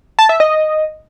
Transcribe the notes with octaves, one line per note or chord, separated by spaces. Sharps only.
A5
E5
D#5